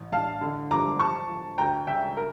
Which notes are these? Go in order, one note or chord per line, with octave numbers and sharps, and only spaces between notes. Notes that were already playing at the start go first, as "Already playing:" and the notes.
Already playing: A1
A1 F5 A5
D3
F3 A#5 D6
F3 A5 C#6
F3
D2 G5 A#5
C#3 E5 G5
A#4